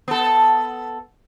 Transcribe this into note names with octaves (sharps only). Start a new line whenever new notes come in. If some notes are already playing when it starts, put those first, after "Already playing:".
B3 A4